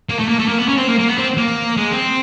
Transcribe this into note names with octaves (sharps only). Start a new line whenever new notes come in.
A#3
A3
A#3
A3
A#3
B3
C#4
C4
A#3
A#3
B3
C4
A#3
G#3
C4